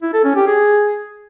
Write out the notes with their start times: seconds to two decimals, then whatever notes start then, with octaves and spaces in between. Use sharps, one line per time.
0.02 E4
0.14 A4
0.25 C#4
0.36 G4
0.47 G#4